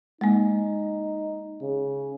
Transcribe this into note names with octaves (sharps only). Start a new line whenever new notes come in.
G#3 A#3 D#4
C#3